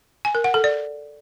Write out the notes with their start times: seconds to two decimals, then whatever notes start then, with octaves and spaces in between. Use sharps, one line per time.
0.25 G#5
0.35 A#4
0.44 F#5
0.54 A4
0.64 D5